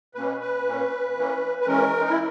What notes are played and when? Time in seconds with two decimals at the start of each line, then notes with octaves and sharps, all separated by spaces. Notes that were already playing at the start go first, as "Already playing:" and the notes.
0.14 B2 A#3 C#4 B4
0.40 B4
0.66 A#2 A#3 C#4
1.17 E3 A#3 C#4
1.61 B4
1.67 E3 G#3 C#4 A#4
2.00 D#4
2.09 E4